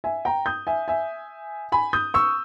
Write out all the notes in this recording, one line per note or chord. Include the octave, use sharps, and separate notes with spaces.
E5 G#5
G5 A#5
D#6 G6
E5 G#5
E5 G#5
G#5 B5
D#6 G6
C#6 E6